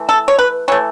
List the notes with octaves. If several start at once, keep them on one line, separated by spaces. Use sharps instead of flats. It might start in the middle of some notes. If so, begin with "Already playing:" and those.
Already playing: E3 A3
A4
C#5
B4
E3 A3 C#5